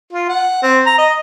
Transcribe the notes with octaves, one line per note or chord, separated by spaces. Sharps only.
F4
F#5
C4
A#5
D#5